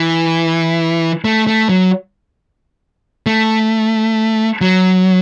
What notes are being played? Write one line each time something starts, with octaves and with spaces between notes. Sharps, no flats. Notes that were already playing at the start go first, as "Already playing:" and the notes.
Already playing: E3
A3
A3
F#3
A3
F#3